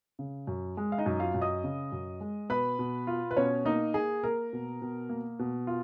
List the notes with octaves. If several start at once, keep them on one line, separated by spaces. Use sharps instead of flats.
C#3
F#2
G#3
F5
D#4 D#5
F#2
F4 F5
F#2
D#5 D#6
C#3
F#2
G#3
B2 B4 B5
B2
F4
B4
B2 C#4 C#5
A#3 D#4 D#5
A#3 G#4
A#3 A#4
B2
B2
A#3
B2
F4